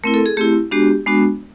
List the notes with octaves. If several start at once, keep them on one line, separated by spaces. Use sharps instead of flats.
A3 C4 E4 A#4
A4
G#4
A3 C4 E4 G4
G#3 B3 D4 F#4 G4
G#3 B3 D4 F#4